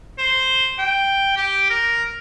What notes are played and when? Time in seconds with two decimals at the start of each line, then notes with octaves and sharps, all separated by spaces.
0.19 C5
0.79 G5
1.37 G4
1.70 A#4